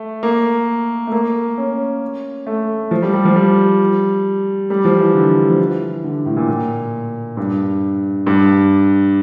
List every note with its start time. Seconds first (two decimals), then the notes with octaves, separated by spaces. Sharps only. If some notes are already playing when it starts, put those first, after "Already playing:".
Already playing: A3
0.23 A#3
1.07 A3
1.12 A#3
1.58 C#4
2.47 A3
2.91 F3
3.02 G3
3.13 G3
3.25 F3
3.36 G3
4.70 G3
4.85 F3
4.99 E3
5.15 D3
5.49 F3
5.58 E3
6.04 D3
6.26 A2
6.37 A#2
6.48 A#2
7.37 G2
8.27 G2